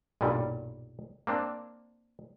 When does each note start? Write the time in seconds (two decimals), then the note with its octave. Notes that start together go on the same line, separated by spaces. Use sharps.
0.21 B1 G2 A#2 G3
1.27 A#3 C4 D4